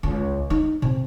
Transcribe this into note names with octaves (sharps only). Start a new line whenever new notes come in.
C#2
D#4
C3